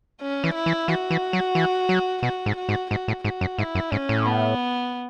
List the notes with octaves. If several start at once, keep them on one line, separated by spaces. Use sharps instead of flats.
C#4
E3
E4
E3
E3 F#4
E3
F#3
E3
F#3
B2 F#4
G#2
F#4
G#2
G#2 F#4
A2
G#2 F#4
F#2
G#2 E4
F#2
G#2 C#4
A2
B3